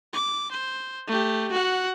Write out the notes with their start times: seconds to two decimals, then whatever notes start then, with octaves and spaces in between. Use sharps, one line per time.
0.13 D6
0.51 C5
1.07 A3 G4
1.52 F#4 F#5